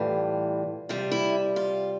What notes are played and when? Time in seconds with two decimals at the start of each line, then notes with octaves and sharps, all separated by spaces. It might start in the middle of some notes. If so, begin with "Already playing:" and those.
Already playing: A2 E3 G3 F4
0.89 C3 G3 F4
1.12 E4
1.56 F4